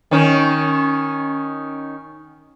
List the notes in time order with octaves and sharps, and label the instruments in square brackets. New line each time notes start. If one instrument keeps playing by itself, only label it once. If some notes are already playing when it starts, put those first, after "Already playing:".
[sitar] D#3 C#4